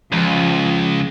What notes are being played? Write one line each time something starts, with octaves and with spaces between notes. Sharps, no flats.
C#2 F3